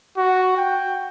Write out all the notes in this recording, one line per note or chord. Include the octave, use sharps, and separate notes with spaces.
F#4
G5